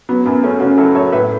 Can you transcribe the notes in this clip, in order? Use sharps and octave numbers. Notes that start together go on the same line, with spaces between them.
F#3 B3
F#2 B3
F#3 A3 C#4
C#3 C#4 F#4
F#3 E4 A4
F#2 A4 C#5
A2 B4 E5